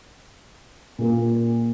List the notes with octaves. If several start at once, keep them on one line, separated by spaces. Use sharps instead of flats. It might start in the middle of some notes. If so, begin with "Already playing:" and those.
A#2 A#3